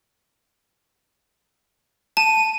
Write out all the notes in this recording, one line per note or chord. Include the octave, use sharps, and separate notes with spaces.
A5 D#7